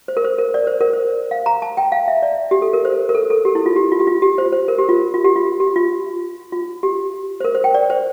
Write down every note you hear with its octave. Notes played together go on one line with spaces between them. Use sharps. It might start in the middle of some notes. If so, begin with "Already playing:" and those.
C5
A#4
C5
A#4
D5
C5
A#4
C5
F5
A#5
A5
G5
F5
E5
D5
G4
A4
A#4
C5
A#4
A4
A4
G4
E4
F4
G4
F4
G4
F4
G4
C5
C5
A#4
G4
F4
F4
G4
F4
G4
F4
F4
G4
C5
A#4
C5
G5
D5
C5